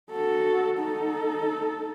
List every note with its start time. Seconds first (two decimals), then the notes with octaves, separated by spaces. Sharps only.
0.11 F#4 A4
0.80 D#4 A4